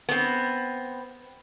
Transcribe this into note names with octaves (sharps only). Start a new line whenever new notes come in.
B3 C4